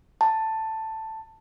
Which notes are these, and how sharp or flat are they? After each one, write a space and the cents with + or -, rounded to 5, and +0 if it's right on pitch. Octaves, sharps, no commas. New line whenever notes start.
A5 +10